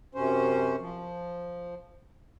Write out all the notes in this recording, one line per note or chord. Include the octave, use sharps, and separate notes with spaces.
F#2 C3 C#4 C5
F3